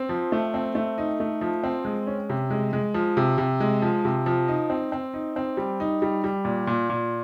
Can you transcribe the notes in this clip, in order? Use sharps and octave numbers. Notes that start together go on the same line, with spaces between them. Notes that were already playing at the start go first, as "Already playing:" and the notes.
Already playing: C4
F3
A3
C4
A3
D#4
A3
F3
C4
G#3
C#4
C3
G#3
G#3
F3
C3
C3
G#3
F3
C3
F3
D#4
C4
C4
D#4
C4
G3
D#4
G3
G3
A#2
A#2
A#2